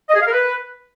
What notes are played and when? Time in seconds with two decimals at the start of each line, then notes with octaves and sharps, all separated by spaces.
0.09 D#5
0.15 G#4
0.21 F5
0.27 A#4
0.32 B4